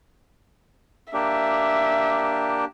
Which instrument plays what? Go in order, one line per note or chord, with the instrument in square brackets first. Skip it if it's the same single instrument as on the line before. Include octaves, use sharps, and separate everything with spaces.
[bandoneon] A#3 D4 G4 [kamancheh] E5